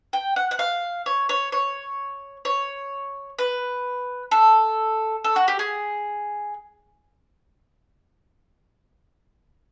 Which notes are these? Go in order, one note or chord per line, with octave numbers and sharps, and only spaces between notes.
G5
F#5
F#5
F5
C#5
C#5
C#5
C#5
B4
A4
A4
F#4
G4
G#4